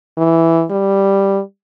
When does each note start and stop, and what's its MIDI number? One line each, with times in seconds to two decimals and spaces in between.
0.17 0.64 52
0.71 1.41 55